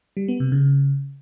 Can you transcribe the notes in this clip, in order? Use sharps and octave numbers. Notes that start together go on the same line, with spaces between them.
G3
B3
C3
C#3